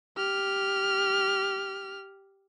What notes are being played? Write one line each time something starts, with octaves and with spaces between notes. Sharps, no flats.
G4 F6